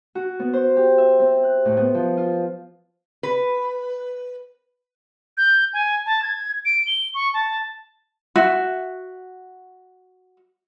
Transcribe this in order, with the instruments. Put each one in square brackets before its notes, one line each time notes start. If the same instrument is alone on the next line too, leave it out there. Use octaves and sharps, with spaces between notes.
[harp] F#4
B3
C5
G4
E5
C4
F#6
A2
B3
F3
F4
[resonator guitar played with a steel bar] B4
[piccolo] G6
G#5
A5
G#6
D7
G7
C#6
A5
[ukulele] F#4 E5